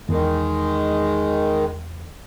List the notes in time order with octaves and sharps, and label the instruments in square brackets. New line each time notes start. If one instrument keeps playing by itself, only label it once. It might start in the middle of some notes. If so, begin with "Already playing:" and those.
[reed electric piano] E2 [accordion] D#3 G#3